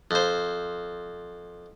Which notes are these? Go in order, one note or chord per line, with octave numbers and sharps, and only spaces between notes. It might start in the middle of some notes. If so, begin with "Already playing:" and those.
F2 C5